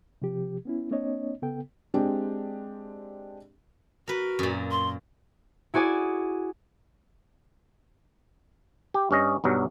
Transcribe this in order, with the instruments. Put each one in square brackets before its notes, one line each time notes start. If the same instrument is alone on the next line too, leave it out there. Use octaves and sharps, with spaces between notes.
[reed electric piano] C3 F3 G4
B3 C#4 E4
A#3 C4 D4 C#5 D#5
C#3 B3 A4 G5
[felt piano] G#3 C4 D4 G4
[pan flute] F#4 [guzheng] A#4 B4
[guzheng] F#2 A#2
[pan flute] C6
[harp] E4 F#4 G#4 D5 G#5
[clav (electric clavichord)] G4
G2 C#4 D#5
B1 G2 F#3